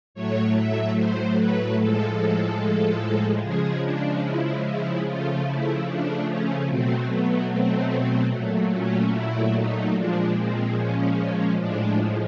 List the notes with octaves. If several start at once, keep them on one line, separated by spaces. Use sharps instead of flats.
A2 F#3 A3 C#5
E5
C5
B4
A2 F3 G#3 A4
C#3 F3 G#3 G#4
D4
E4
E4
C#3 F3 A3 F4
E4
D4
C#4
B2 F#3 A3 C4
B3
C4
A#2 F#3 A3
C#4
E4
D#4
A#2 F3 G#3 D4
C4
C#4
A2 F3 G#3 D4